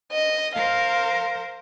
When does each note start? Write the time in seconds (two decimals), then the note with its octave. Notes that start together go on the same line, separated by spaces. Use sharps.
0.12 D#5
0.55 A#4 C5 F5